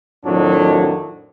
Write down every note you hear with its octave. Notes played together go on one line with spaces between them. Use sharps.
F2 A2 D#3 F#3 D4